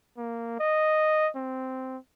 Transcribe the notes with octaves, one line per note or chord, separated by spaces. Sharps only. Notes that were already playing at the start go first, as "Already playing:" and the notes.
A#3
D#5
C4